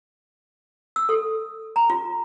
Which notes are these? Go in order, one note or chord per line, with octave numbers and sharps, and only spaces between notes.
E6
A4
A#5
F4